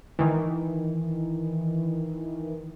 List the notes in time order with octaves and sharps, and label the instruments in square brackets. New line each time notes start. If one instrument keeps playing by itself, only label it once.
[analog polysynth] D#3 E3